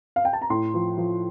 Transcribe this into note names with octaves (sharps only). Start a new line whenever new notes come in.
F5
G5
A5
A#5
A2 C6
F3
F3